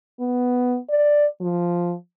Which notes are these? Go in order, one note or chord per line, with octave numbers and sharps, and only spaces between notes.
B3
D5
F3